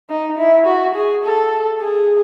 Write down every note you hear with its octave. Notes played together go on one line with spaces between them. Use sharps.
D#4
E4
F#4
G#4
A4
G#4